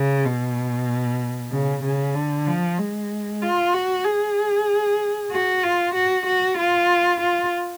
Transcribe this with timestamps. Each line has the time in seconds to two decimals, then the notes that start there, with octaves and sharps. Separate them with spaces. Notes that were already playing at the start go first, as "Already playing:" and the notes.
Already playing: C#3
0.25 B2
1.52 C#3
1.84 C#3
2.15 D3
2.47 F3
2.78 G#3
3.42 F4
3.73 F#4
4.05 G#4
5.31 F#4
5.63 F4
5.94 F#4
6.26 F#4
6.58 F4
7.21 F4